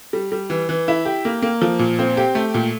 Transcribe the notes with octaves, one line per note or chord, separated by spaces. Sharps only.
G3
G3
E3
E3
E4
G4
A#3
A#3
F3
A#2
C4
G4
A3
A#2